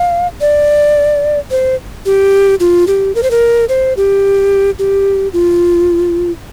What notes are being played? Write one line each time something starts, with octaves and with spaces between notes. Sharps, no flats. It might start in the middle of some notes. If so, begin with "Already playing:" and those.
Already playing: F5
D5
C5
G4
F4
G4
A#4
C5
A#4
C5
G4
G4
F4